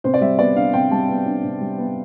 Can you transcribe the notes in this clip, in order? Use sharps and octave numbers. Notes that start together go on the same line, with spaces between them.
C3 C5
D5
G3 E5
B3 D5
D4 F5
C3 G5
G3 A5
B3
D4
C3
G3
B3